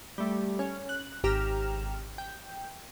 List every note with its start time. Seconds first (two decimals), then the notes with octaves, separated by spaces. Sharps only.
0.18 G3 A3
0.59 C#4
0.89 F#6
1.24 G#1 G4 A#5 F6 E7
2.18 G5